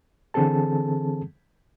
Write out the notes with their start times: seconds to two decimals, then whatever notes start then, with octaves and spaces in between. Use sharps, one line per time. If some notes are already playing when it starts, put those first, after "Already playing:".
0.34 D3 E3 C4 G#4 A4 A5